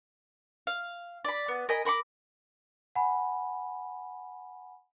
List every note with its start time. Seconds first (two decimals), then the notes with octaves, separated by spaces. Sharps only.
0.67 F5
1.25 D5 B5
1.48 B3
1.69 A#4 D#5 G#5 B5
1.85 A#4 B5 C#6 D6
2.95 F#5 G#5 B5